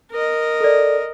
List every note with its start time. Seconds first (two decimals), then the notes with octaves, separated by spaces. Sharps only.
0.11 A#4 D#5
0.61 A4 D5